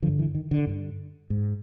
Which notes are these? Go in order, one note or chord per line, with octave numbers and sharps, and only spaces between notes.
G2 D3 F3
E3
D#3
D3
G2 D3
G#2